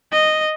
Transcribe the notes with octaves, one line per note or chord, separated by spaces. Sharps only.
D#5